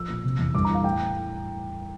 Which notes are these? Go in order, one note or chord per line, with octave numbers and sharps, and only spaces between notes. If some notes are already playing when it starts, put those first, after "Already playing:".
Already playing: F3 E6
A#2
C3
E2
G2 D6
A#5
E3 F5
A2 G5